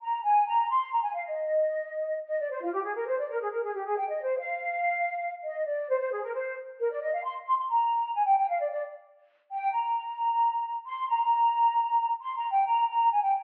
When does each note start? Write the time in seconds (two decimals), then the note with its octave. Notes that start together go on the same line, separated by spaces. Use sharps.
0.02 A#5
0.23 G#5
0.46 A#5
0.70 C6
0.92 A#5
1.02 G#5
1.14 F5
1.26 D#5
2.27 D#5
2.39 D5
2.49 C5
2.61 F4
2.72 G4
2.83 G#4
2.95 A#4
3.06 C5
3.18 D5
3.29 A#4
3.40 G#4
3.51 A#4
3.62 G#4
3.74 G4
3.85 G#4
3.97 G5
4.08 D#5
4.22 C5
4.38 F5
5.43 D#5
5.65 D5
5.89 C5
5.99 C5
6.12 G#4
6.23 A#4
6.34 C5
6.79 A#4
6.91 D5
7.01 D#5
7.13 F5
7.23 C6
7.47 C6
7.58 C6
7.69 A#5
8.14 G#5
8.26 G5
8.38 G5
8.48 F5
8.59 D5
8.70 D5
9.50 G5
9.72 A#5
10.86 C6
11.08 A#5
12.20 C6
12.36 A#5
12.51 G5
12.67 A#5
12.89 A#5
13.11 G#5
13.22 G5